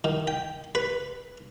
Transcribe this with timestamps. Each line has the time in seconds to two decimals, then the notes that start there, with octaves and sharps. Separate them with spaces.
0.04 D#3
0.27 G5
0.75 B4